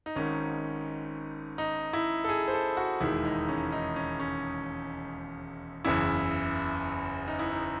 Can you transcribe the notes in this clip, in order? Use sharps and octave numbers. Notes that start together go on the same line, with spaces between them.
D#4
G#1 G#2 D#3 C#4
D#4
E4
A4
G#4
C5
A4
F#4
E1 D#2 D#3 G#3 E4
D#4
C#4
D#4
C#4
C#4
F#1 E2 C#3 E4
D#4
E4
D#4